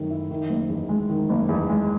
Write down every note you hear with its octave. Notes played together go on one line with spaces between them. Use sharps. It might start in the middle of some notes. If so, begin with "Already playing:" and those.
Already playing: F#2 D#3 A3
E4
D#3
F#1
E2
G#3
D#3
F#1
E2
G#3